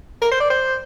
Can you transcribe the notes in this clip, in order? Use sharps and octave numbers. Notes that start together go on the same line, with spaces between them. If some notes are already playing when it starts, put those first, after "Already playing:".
A#4
C5
D5
C5